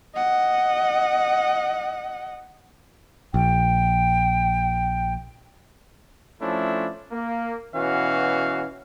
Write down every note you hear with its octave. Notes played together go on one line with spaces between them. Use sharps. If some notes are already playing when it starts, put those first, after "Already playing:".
D#5 F#5
A#1 G5
F3 A3 C#4 D4 E4
A#3
B2 E3 C#4 F#4 F5